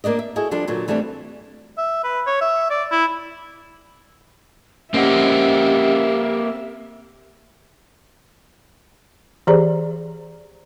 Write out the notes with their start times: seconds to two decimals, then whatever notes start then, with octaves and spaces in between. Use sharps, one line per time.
0.04 A#3 D4 D5 D#5
0.19 E5
0.36 E4 F#4 G#4 A4 D#5
0.51 F3 G3 D4 A4
0.68 A#2 D3 F#3
0.88 E3 G3 A3 C4 D4
1.78 E5
2.04 B4
2.26 C#5
2.41 E5
2.70 D5
2.91 E4
4.94 A#3 C4 C#4 G4 D#5 E5 F#5
9.47 E3 G4 G#4 C5 D5 A#5